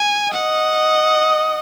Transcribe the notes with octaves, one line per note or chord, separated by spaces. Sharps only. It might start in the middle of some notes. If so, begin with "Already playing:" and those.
Already playing: G#5
D#5 F#5